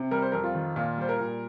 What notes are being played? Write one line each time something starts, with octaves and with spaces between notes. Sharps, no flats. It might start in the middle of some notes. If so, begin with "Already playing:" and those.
Already playing: C3
G3 A#4
C5
F2 A#4
F4
D#3
A#2 F4
G3 C5
A#4
A#2